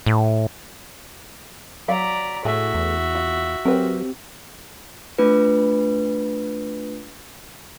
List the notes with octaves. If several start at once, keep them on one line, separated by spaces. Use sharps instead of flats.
A2
F#3 D5 F5 A#5 B6
A2 A3 F#4 G#4 E5
E2
F4
F#3 C4 G4 A#4 B4
A3 D4 F4 B4